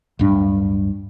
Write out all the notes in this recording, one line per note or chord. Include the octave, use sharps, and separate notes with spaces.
D1 G2 D4